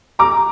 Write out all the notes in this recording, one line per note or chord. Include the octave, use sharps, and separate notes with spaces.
A#5 D6